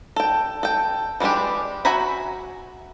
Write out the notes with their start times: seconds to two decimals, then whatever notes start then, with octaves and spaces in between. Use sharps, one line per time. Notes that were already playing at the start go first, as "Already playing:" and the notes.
0.16 A4 G5
0.63 A4 G5
1.20 E3 G3 G#3 D4 G4
1.85 F#4 E5 G#5 A#5 B5